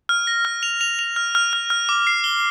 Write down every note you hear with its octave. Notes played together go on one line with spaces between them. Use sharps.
F6
A#6
F6
F7
F7
F7
F6
F6
F6
F6
D6
C7
G7